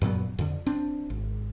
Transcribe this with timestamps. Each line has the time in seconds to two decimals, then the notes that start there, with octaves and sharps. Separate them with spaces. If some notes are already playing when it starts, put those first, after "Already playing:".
0.02 F#2 A#2 F#3 B3
0.39 F2 D3
0.66 C4 D4
1.10 G#1